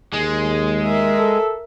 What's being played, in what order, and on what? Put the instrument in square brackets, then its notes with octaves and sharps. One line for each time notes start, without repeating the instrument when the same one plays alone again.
[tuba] D#2 [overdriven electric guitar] G#3
[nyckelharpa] A#4 E5
[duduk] A4